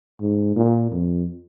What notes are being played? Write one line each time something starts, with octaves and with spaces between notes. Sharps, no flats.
G#2
A#2
F2